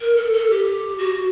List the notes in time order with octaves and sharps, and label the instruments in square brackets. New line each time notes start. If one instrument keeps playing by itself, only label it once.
[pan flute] A#4
A4
A4
G4
F#4